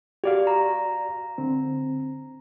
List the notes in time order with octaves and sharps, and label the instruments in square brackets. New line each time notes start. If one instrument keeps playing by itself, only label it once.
[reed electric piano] F#4 D5 F5 [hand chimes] G4
[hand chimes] A#5
[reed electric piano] D3 C4